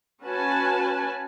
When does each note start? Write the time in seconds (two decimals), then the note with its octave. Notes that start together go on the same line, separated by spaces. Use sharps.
0.23 C#4 F#4 B4 G#5 A5